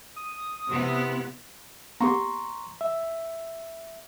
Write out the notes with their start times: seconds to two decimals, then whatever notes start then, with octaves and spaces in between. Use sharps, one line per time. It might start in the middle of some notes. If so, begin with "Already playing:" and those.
0.16 D#6
0.70 C3 B3 E4
2.01 A#3 B3 G4 A#5 C6 C#6
2.81 E5